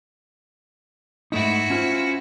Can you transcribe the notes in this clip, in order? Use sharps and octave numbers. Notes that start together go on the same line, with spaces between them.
G#2 A3 D#4 E4 F#4
C#4 F4 C5